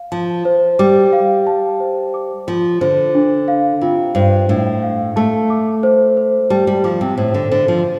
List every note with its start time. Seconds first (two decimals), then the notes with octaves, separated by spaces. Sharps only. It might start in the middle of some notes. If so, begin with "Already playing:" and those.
Already playing: F5
0.12 F3 A5
0.45 C5
0.79 G3 D6
1.13 F5
1.47 A5
1.80 C5
2.14 D6
2.47 F3 F4
2.81 D3 C5
3.15 D4
3.48 F5
3.81 C3 F4
4.15 G2 C5
4.49 A2 D4
4.82 F5
5.16 A3 A5
5.50 D6
5.83 C5
6.17 C5
6.50 G3 A5
6.67 G3
6.84 F3 D6
7.01 C3
7.17 A2 C5
7.34 D3
7.51 D3 C5
7.68 F3